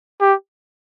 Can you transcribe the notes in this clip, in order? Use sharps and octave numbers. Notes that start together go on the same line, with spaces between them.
G4